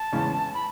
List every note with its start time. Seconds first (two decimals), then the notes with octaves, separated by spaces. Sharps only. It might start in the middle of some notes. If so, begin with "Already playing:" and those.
Already playing: A5
0.12 E2 C#3 E3 G#3 C#4
0.54 B5